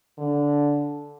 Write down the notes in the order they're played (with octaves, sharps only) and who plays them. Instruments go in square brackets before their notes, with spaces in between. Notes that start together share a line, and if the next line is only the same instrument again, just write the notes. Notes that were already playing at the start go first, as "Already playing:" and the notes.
[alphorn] D3